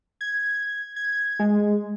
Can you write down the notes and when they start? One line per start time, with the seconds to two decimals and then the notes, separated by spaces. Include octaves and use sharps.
0.21 G#6
0.96 G#6
1.39 G#3